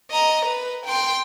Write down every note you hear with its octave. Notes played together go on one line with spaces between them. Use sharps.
D#5 A#5
B4
G5 C6